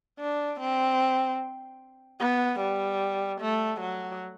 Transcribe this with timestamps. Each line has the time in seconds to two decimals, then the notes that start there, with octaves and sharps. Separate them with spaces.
0.20 D4
0.61 C4
2.20 B3
2.60 G3
3.41 A3
3.81 F#3